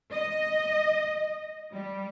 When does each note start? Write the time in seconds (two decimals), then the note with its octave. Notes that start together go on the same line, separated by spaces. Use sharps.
0.12 D#5
1.72 G3